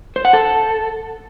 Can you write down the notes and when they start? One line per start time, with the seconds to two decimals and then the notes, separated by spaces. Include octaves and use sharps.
0.16 C5
0.25 F#5
0.33 A4